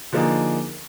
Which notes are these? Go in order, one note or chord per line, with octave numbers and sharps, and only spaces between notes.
D3 F3 A#3 D#4 G#4